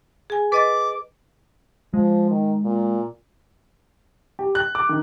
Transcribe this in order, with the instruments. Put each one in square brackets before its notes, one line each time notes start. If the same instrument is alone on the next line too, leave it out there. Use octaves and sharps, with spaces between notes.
[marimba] G#4 G#5
[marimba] B4 D#5 A6 [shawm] D6
[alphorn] F3 [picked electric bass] G#3
[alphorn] D#3
A#2
[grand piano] G4
F#6
D6
D#3